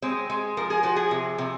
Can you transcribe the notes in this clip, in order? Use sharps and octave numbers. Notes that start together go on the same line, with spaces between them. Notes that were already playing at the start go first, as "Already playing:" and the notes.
G#3 C4
G#3
F3 A#4
G#4
F3 F#4
G#4
C3
C3